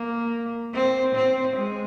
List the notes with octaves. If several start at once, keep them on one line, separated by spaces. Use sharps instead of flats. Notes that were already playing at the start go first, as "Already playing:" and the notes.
Already playing: A#3
C4
C4
G#3